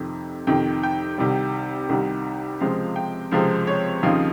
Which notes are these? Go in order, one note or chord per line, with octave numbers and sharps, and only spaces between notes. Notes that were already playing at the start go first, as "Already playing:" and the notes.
Already playing: F2 C3 D#3
F2 C3 D#3 G5
G5
C2 C3 D#3 G3
C2 C3 D#3 G3
C#2 C3 F3 G#3 C4 F5
G5
C#2 C3 F3 G#3 C4 F5
C#5
D#2 C#3 F3 C4 D#4 F5